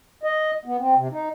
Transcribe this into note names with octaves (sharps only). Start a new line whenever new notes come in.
D#5
B3
C4
C3
D#4